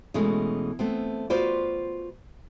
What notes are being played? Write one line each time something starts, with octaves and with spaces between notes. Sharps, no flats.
B2 E3 G#3 A3 C#4
A3 B3 C4
F4 F#4 B4 C5 D5